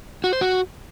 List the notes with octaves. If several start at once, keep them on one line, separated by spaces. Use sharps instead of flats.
F#4
C5
F#4